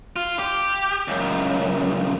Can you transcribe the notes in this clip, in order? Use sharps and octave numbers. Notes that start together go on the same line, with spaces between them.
F4
G4
C#2 F#2